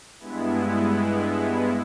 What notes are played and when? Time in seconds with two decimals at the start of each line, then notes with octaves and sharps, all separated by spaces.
0.20 G2 G#3 B3 E4